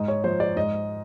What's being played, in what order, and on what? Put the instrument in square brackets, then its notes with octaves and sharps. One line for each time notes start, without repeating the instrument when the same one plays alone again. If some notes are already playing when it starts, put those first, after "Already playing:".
Already playing: [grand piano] G#2 D#5
C#5
F3 C5
D5
G#2 D#5